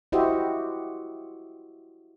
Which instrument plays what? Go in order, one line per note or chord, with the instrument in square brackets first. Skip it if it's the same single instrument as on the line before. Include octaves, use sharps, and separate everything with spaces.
[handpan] E4 F#4 G4 C5 D#5 E5